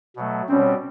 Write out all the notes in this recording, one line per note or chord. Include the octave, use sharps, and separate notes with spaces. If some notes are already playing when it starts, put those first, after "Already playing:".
B2 F#3 A3
B2 G3 C4 C#4